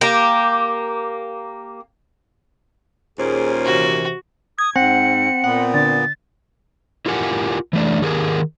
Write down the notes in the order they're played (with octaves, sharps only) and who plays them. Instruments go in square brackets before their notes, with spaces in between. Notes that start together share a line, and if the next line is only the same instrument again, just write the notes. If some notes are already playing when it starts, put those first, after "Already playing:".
[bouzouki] A#3 G4
[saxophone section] D#2 A#2 C#4 [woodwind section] G#4 [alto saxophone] C5
[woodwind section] C3 E3 [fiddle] F#4
[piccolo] D#6 [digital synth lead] G#6
[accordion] G#2 [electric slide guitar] C4 [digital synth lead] F#5 [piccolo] C#7
[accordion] A#2 B3 [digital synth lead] F#5
[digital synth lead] D3 [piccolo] A6
[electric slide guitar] E4 F4 G4 A#4 F#5 G#5
E3 A3 D4
D#3 G4 G#4 A#4 D5 G#5